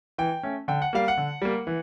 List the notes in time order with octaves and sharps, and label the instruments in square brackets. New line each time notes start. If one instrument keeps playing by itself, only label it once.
[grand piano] E3 G5
A3 C#4
D3 G5
F#5
G3 A#3 F5
F#5
D3
G3 A#3
E3